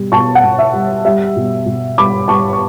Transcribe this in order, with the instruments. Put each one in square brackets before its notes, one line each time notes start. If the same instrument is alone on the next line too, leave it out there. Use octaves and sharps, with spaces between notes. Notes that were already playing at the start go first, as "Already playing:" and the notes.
Already playing: [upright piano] B2 G3
B2 A5 C#6
F#5
B2
E5
G3
G3 E5
B2
B2
G3 B5 D6
G3 A5 C#6
C#6